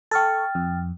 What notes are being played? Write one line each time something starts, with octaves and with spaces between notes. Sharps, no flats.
A4 G5 C#6 F6 A6
F2